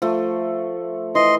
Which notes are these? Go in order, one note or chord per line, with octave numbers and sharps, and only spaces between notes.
F3 A3
E3 D#5 C6